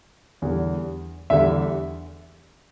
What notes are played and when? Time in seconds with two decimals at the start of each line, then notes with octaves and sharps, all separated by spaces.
0.42 E2 D3 G3
1.30 E2 D3 G3 E5